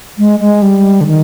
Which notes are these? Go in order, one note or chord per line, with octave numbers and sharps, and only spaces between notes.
G#3
G#3
G3
D3
D#3